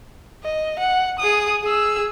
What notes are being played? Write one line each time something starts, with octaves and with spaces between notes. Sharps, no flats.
D#5
F#5
G#4 D#6
G#4 E6